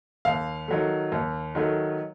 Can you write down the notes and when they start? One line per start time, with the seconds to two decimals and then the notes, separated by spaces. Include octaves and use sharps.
0.25 D#2 F5
0.68 D#3 F#3 A3
1.12 D#2
1.55 D#3 F#3 A3